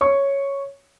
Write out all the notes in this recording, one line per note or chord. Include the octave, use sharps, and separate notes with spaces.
C#5 C#6